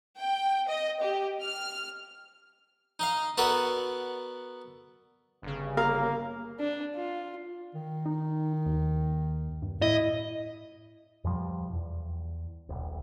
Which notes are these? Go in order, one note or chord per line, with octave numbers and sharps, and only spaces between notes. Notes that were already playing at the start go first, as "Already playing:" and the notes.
G5
D#5
G4
F6
D#4 D#5 F5
B3 F#4 A4 A#4 D5 F#5
G1 C#3
A#3 A#4 F5 A#5
D4
F4
D#3
D#4
D#2
G2
A2 E4 D#5
F2 B2 F3 G3
E2
D#1 B1